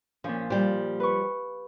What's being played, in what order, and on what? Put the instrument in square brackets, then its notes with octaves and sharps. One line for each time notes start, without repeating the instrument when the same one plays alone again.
[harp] A#2 F3 [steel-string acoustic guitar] C#4
[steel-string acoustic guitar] F3 G3 [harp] G4
[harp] B4 C#6